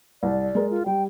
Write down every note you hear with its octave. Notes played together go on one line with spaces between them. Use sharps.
C2 D5
G#3 A#4
F4
G3 G5